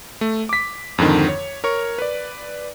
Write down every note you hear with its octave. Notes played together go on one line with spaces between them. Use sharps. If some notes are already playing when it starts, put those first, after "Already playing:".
A3
D6 B6
F2 G#2 D3 D#3
C#5
A#4 C#5 C#6
B4 D5